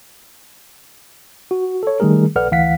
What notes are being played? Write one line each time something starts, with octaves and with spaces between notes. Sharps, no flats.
F#4
A4 C#5
D#3 G3 A3 G#4 A#4
A#1 A4 B4 D5 F#5 F6
D2 E3 F5 F#5 B6